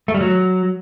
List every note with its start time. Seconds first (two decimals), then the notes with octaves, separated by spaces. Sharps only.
0.08 A3
0.15 G3
0.21 F#3